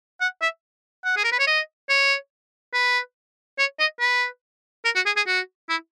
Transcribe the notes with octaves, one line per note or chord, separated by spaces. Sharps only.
F#5
E5
F#5
G#4
A#4
B4
C#5
D#5
C#5
B4
C#5
D#5
B4
A#4
F#4
G#4
G#4
F#4
E4